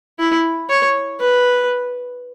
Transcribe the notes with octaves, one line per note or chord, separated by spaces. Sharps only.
E4
C#5
B4